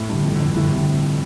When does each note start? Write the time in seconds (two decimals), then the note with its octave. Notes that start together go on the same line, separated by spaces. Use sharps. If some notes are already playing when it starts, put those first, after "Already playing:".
Already playing: A2
0.09 G2 D3
0.24 F2
0.35 G2 D3
0.55 A2 D3
0.71 C3
0.77 D3